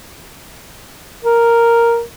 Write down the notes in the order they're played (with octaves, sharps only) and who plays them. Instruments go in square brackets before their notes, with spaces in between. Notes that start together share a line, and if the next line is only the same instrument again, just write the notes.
[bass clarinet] A#4